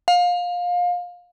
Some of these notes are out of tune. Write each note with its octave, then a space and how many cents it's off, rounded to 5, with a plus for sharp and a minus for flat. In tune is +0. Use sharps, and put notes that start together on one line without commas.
F5 +25